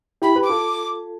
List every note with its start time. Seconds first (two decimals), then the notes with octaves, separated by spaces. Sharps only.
0.22 E4 G4 B5
0.35 G4 B4
0.43 D6
0.49 F4 A4